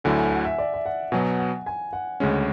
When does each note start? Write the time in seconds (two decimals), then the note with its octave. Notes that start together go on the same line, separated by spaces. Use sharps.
0.04 D2 D3 F#3 A3 E4 G#5
0.19 G#5
0.32 F#5
0.45 E5
0.58 D5
0.74 E5
0.86 F#5
1.12 B2 F#3 B3 G#5
1.39 F#5
1.66 G#5
1.93 F#5
2.20 D2 C#3 G#3 C#4